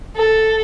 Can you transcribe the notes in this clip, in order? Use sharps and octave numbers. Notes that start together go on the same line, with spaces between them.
A4